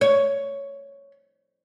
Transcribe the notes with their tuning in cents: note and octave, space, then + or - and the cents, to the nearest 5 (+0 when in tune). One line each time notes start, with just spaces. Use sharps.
C#5 +5